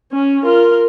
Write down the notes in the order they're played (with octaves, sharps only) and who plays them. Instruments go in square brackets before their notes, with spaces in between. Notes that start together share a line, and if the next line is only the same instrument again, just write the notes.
[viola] C#4
F4 A#4